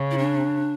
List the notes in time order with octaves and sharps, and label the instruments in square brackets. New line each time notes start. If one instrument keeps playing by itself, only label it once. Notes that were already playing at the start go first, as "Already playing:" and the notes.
Already playing: [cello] C#3
[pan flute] E4
D4